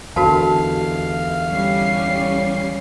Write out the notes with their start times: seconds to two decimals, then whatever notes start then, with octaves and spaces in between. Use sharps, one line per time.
0.16 E2 D3 F#4 A#4 F5 A5
1.46 G3 C#4 C7